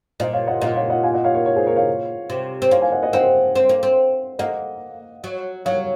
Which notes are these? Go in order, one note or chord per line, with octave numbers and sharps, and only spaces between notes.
A#2 C5 D#5
C#5 F5
D#5 F#5
A#2 D#5 F#5
C#5 F5
D#5 F#5
F5 G#5
D#5 F#5
C#5 F5
A#4 C#5
A#4 C#5
G#4 C5
A#4 C#5
C#5 F5
C3
C4
A#3 C#5 F5
F5 G#5
D#5 F#5
D#5 F#5
C4 D#5 F#5
C4
A#3
C4
A#3 D#5 F#5
F#3
F#3 C#5 F5